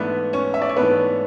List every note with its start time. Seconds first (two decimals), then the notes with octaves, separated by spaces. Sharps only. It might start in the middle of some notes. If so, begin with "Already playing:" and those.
Already playing: G#2 E3 A3 B3 D4 B4
0.33 C#4 C#5
0.54 E5
0.62 D5
0.69 C#5
0.76 G#2 E3 A3 B3 D4 B4